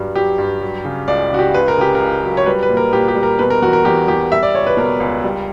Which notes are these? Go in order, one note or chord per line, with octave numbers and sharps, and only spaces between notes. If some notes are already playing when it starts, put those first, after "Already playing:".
Already playing: G2 F#3 G3
F#3 G4
G2
F#3
C#3
C#2 D5
C#3 F#4
G4
C#2 B4
A#4
C#3 G4
A#4
C#2
F#3
C#5
G3 B4
B4
A#2
A#4
A#2 G4
G4
G3
A#4
B2 B4
A#4
E2 F#4
A#4
E2 G4
E2 G4
G3 E5
D5
C#2 C#5
B4
B2 A#4
C#2
G3